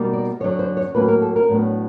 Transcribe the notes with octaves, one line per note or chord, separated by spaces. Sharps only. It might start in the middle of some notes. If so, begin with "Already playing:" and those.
Already playing: B2 G3 A#3 D#4
D5
F#2 D3 F#3 C#5
C5
C#5
A2 F#3 A#3 C#4 B4
A#4
A4
A#4
A2 F#3 B3 D4